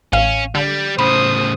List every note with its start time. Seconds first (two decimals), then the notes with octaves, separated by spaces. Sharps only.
0.13 A1 C#4 F5
0.55 D3 G3
0.99 A2 C#3 C5 B5 D#6